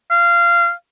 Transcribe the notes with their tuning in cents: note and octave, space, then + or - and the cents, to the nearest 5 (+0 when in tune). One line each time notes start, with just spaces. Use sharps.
F5 -20